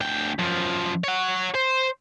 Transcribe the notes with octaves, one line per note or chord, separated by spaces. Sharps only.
D2 G5
F#2 F3
C#5 F#5
C5